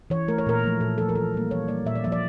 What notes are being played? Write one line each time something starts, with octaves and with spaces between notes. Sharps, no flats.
E3 C#5
A3 A#4
C#5
A#2 A#4
F3 A3
A#2 A4
F3 A3 A4
A#4
E3 A4
G3 A#3
E3 C#5
G3 A#3 D5
A#2 E5
D5
F3 A#3 E5
D5